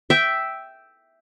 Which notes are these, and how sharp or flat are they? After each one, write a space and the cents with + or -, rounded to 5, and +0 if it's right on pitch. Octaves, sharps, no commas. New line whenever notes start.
E5 +0 G5 -5